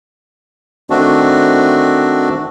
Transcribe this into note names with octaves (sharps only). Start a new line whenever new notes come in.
D#3 A3 C4 D4 F#4